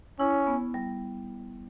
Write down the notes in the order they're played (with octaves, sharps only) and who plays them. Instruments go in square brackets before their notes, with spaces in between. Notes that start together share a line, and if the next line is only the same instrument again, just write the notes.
[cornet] C#4 [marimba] E4
[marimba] B3
G3